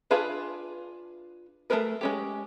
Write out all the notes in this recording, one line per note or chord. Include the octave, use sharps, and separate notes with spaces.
D4 F4 G#4 B4 F5
A3 D4 G#4 A#4 B4
G#3 C#4 G4